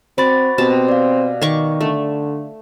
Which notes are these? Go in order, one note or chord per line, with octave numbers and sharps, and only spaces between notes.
C4 F#4 C5 D5 B5 D6 A6
B2 C4 G4 A5
D5 F5
D#3 C#6 D6
D3 A3